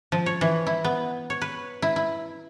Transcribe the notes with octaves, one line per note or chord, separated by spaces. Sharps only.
F3
C#5
E3
E4
B3
C#5
B4
E4
E4